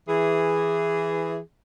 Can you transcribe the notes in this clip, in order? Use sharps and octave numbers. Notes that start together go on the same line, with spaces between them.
E3 G#4